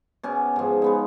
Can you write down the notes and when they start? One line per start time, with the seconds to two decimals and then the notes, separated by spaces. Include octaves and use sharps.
0.23 B2 C#4 G#5 D6
0.56 G#2 F3
0.82 G#3 B3 D#4